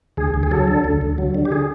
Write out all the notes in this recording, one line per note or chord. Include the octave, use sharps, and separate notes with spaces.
D2 G#4
D2
G#4
F#3 A4
D3
D2
D2
F#3
D3
G4
G#4